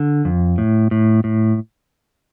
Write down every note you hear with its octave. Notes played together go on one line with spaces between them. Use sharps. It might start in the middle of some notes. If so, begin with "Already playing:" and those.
Already playing: D3
F2
A2
A2
A2